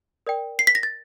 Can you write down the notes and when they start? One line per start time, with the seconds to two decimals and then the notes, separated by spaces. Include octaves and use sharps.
0.27 A#4 D5 G5
0.59 C7
0.67 B6
0.75 A#6
0.83 A6